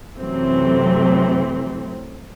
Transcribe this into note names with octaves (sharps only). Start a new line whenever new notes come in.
F#2 C3 E3 F#3 A3 C4